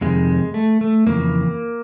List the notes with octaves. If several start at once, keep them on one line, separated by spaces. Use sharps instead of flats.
F2 C3 D#3 G#3
A3
A3
F2 C#3 E3 A#3